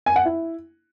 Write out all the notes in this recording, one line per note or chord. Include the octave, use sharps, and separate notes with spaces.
G#5
F#5
E4